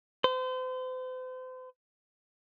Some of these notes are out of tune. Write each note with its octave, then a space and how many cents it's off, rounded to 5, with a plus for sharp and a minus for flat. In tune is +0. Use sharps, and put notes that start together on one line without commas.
C5 -40